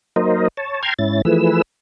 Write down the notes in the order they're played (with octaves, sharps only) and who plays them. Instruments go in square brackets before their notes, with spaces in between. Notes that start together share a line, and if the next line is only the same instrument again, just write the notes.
[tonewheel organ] F#3 A#3 D#4 A#4 C5 D#5
C#5 A5
G5 A5 A#5 C6 F6 G#6
G#2 C#4 E4 A6
E3 F3 A3 G#4 B4 E6